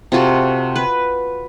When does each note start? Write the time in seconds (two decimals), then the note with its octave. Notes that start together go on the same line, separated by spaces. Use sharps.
0.12 C3 F4 F#4 A4
0.76 B4